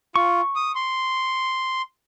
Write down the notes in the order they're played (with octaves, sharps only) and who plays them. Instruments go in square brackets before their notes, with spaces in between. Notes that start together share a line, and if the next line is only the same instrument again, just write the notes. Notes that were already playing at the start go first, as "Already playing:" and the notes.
[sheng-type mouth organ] F4 [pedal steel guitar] C#6
[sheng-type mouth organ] D#6
C6